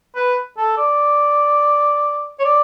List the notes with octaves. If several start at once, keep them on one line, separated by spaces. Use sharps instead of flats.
B4
A4
D5
C#5
D5